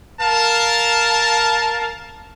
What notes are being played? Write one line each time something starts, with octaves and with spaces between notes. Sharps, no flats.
A#4 F5 A5